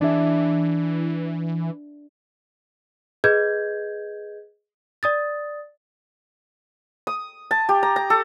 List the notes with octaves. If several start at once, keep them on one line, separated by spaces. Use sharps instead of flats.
E3 D4 G#4 E5
G#4 B4 D#5 G6 G#6
D5 D#6 A6
D#6
A5
G4
A#5
A#5
A4